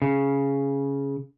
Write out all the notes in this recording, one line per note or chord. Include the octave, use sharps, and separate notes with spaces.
C#3